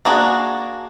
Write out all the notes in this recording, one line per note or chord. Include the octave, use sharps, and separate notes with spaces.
A#3 D4 F#4 G#4